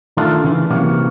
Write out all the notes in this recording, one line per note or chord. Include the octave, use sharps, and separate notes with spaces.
D#3 A3 D4 F4
C#3 E3
C3 E3 F#3 A#3